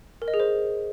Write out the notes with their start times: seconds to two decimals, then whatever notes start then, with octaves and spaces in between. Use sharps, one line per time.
0.22 A#4
0.28 D#5
0.34 G#4
0.40 C5